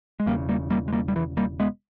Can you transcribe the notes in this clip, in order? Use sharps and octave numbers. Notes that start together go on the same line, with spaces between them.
G#3
E1 E2 C#3 G3 A#3
G3 A#3
G3 A#3
G#3
G3 A#3
G3
E3
G3 A#3
G#3 B3